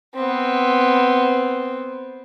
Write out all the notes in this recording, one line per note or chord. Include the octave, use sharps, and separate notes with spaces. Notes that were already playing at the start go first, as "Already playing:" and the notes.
B3 C4